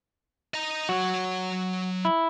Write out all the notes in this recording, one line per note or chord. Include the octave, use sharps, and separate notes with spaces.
D#5 A#5
F#3 F#4 C#5
E4